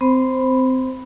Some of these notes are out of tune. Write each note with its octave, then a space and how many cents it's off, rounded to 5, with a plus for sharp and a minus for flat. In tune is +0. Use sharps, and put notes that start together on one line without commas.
C4 -20 C5 +0 B5 +0